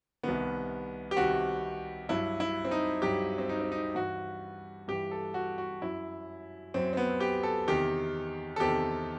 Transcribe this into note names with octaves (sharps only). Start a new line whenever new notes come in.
C2 C3 D#3 B3
G4
C2 C3 D#3 F#4
G2 F#3 E4
E4
C4
D#4
G2 F#3 G4
C4
D#4
C4
D#4
G2 E3 F#4
G2 E3 G4
A4
F#4
F#4
F#2 F#3 E4
F#2 F#3 C4
C4
B3
G4
A4
E2 C3 D#3 G4
A4
E2 C3 D#3 G4